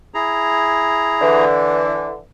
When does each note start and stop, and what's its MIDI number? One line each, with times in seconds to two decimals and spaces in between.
0.14 1.45 64
0.14 1.45 68
0.14 1.45 82
1.21 2.16 50
1.21 2.16 52